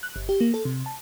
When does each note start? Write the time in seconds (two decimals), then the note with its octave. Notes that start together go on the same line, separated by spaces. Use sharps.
0.03 F#6
0.16 G1
0.29 G4
0.40 A#3
0.54 A4
0.65 C3
0.86 A5